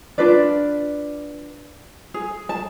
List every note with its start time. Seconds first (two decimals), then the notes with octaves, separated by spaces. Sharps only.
0.18 D4 F4 B4 D5
2.14 G#4
2.49 A5